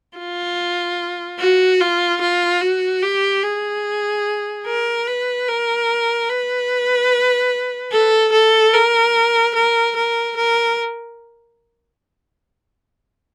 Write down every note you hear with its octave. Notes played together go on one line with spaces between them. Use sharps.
F4
F#4
F4
F4
F#4
G4
G#4
A#4
B4
A#4
B4
A4
A4
A#4
A#4
A#4
A#4